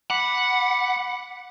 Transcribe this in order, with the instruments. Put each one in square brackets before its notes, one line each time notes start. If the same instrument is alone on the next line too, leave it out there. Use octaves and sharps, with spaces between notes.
[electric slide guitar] F#5 [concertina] B5 D6